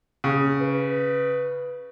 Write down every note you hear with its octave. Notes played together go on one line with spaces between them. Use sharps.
C#3
B4